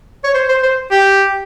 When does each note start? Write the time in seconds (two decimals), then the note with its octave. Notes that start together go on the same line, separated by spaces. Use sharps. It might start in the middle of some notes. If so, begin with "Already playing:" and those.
0.24 C#5
0.34 C5
0.49 C5
0.63 C5
0.92 G4